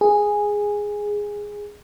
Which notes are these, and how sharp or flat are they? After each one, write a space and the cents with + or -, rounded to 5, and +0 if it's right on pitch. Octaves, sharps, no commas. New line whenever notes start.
G#4 -10